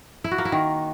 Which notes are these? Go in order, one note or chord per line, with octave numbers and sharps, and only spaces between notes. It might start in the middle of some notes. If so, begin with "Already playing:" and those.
E4
F#4
A#3
E4
D#3